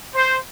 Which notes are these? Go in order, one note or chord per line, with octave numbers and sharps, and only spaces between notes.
C5